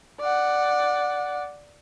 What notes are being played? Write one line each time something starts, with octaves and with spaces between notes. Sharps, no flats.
D5 F#5